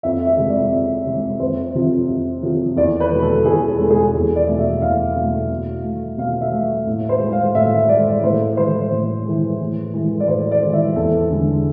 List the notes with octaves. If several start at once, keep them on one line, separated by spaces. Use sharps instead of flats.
F2 E5
E5
C3 G#3
D5
F2
C3 G#3
F2 C5
C3 F3
F2
C3 F3
E2 D5
B4
B2 G#3
A4
E2 G#4
A4
B2 G#3
G#4
E2
D5
B2 A3
E5
E2 F5
B2 A3
B2
A3
B2 F5
E5
A3
A2
C5
G#3
F5
A2 E5
G#3 D5
A2 C5
E3 G#3 C5
A2
E3 G#3
A2
E3 G#3
D5
A2 C5
D5
E3 G#3
E5
E2 A4
D3 G#3